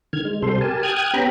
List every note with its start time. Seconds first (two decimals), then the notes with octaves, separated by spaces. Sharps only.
0.13 D3 D#3 F6 G#6
0.25 G#3
0.42 C3 G3 A4 C5 C6
0.61 G4 A#4 G#5 A5
0.83 G5 D#6 F6 F#6 G#6
1.14 B3 C#4 G4 G5 A#5 B5